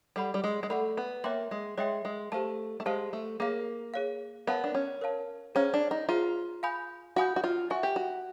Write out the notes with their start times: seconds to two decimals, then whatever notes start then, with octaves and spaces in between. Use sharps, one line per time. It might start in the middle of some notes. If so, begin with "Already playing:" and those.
0.16 G3 A4 D5 F#5 B5
0.34 G3
0.44 G#3
0.63 G#3
0.70 A3 A4 D5 F#5 B5
0.97 B3
1.24 A#3 C#5 E5 G5 C6
1.51 G#3
1.78 G#3 C#5 E5 G5 C6
2.05 G#3
2.32 A3 G4 C5 F5 A5
2.80 A3
2.86 G#3 G4 C5 F5 A5
3.13 A3
3.40 A#3 G#4 C#5 F5
3.94 G#4 C#5 F5
4.47 B3 A#4 C#5 F5 A5
4.64 D4
4.75 C#4
5.01 A#4 C#5 F5 A5
5.55 C#4 G#4 C5 F5 A#5
5.74 D4
5.91 D#4
6.09 F4 G#4 C5 F5 A#5
6.63 F5 G#5 B5 D#6 G6
7.16 F#4 F5 G#5 B5 D#6 G6
7.36 F#4
7.44 F4
7.70 F#4 E5 G#5 C#6
7.83 G4
7.96 F#4